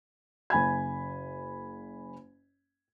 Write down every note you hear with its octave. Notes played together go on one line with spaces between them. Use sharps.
F#1 G#5 B5 G#6